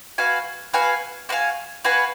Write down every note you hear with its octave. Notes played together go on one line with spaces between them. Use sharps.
F#4 B4 F5 G#5
F#4 B4 F5 G#5
F#4 B4 F5 G#5
F#4 B4 F5 G#5